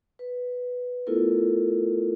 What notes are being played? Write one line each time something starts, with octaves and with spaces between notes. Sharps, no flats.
B4
A3 B3 E4 F4 A4 A#4